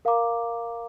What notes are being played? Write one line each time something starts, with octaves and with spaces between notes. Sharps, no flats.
A#4 F5 A#5 D6